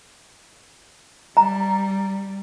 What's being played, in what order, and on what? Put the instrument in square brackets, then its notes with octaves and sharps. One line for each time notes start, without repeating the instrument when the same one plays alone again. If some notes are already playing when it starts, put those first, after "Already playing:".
[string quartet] G3 [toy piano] A#5